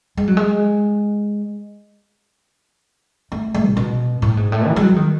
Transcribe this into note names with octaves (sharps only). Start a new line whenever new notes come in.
G#3
F#3
G#3
A3
A3
A2
B2
A2
G#2
A2
E3
G#3
F#3
D#3